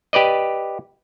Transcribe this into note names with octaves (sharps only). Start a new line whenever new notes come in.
G4 B4 D5 D#5